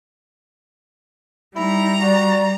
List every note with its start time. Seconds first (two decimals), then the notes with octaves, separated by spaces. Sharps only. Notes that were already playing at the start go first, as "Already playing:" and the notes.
1.56 G3 D#4 E4 A#5
2.01 F#4 D5